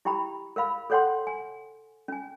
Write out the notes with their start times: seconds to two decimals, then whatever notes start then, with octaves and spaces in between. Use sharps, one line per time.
0.05 E4 G4 G5 A#5 B5
0.56 A#4 B4 F5 B5
0.90 A4 B4 C#5 F#5 G5 C6
1.27 G#5
2.08 C#4 G#5